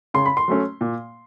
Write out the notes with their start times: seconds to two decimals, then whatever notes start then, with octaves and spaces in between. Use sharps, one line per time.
0.14 C#3 C6
0.26 B5
0.37 C6
0.48 F#3 A3 C#4
0.81 A#2